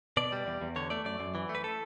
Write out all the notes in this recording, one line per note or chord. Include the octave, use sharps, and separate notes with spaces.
B2 D5
G3
E2
E2
D3 C#5
A3 D5
F#2 D5
F#2
E3
A3
B4
A4